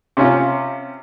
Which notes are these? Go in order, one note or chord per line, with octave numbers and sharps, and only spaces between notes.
C3 C#4 F4